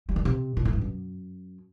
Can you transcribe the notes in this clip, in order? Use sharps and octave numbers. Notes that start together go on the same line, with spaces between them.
G3
D#3
C3
A#2
A2
G2
F#2